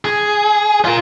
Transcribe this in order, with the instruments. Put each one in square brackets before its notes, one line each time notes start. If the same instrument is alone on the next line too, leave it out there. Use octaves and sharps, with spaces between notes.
[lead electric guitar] G#4
F4 A#4